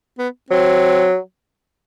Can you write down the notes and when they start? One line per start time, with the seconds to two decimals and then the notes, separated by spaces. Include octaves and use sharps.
0.19 B3
0.50 F#3 C4